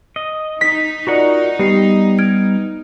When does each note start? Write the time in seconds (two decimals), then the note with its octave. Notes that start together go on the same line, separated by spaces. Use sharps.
0.16 D#5
0.61 D#4 B6
1.07 F4 F#4 A#4 D5 F#5
1.59 G3 B3 G4 C7
2.19 F6 G#6 D7